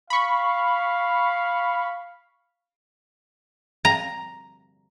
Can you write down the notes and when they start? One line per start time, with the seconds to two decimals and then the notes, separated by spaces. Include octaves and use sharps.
0.10 F5 B5 C#6
3.85 A#5